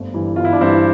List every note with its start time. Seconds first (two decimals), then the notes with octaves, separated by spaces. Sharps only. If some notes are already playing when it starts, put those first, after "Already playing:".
Already playing: G1 A3 C4
0.14 G2 E3
0.36 G1 F4
0.45 E4
0.53 D4
0.59 G2 E3 C4 E4